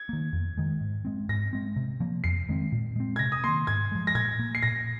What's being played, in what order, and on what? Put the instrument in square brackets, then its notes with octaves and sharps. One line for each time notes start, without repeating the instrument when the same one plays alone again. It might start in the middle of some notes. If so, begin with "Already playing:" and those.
Already playing: [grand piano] G#6
[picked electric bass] D#3 A#3
F2
D#3 G#3
G#2
G#3 C4
[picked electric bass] G#2 [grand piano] A#6
[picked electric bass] G#3 C4
C3
F3 A#3
[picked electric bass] F2 [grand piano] C7
[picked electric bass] D#3 G#3 C4
A#2
G#3 C4
[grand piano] G#6
[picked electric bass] C3 [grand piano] A#6
[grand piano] D#6
[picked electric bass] D#3 A#3 [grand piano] C6
[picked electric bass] G#2 [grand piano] G#6
[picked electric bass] F3 G#3
[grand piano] A#6
[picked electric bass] A#2 [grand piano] G#6
[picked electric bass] A#3
[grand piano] C7
[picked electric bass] A#2 [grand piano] A#6